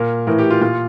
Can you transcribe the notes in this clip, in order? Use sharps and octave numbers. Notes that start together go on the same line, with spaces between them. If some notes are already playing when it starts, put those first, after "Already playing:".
Already playing: A#2 A#4
A2 E3 A#4
G4
F4
A#2 F4